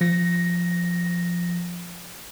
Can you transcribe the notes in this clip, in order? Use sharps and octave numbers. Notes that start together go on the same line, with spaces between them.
F3 A#6